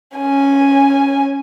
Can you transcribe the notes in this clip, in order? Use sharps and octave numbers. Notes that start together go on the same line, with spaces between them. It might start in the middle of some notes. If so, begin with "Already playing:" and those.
C#4 G#5